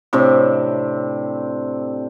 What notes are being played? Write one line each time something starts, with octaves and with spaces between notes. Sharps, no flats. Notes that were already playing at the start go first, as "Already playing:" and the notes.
A2 C3 C4 D4